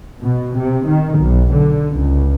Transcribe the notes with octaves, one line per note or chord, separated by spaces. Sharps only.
B2
C3
D#3
B1
D3
C#2